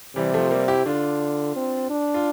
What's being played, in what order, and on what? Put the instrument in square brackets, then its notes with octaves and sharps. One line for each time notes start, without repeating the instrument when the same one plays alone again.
[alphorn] C3 [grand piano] E3 G3
[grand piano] F3 A3
G3 A#3
E4 G4
[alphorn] D3 [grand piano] D4 F4
[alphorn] C4
D4
[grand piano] F4